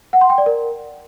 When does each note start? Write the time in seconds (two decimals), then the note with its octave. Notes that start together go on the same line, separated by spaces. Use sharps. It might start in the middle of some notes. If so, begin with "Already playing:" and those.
0.13 F#5
0.21 C6
0.30 G5
0.38 D5
0.46 A#4